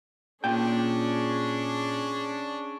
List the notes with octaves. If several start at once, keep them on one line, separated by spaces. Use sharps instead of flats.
A#2 C#4 D4 G#4 G5